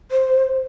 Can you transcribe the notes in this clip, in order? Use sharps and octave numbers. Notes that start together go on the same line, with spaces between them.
C5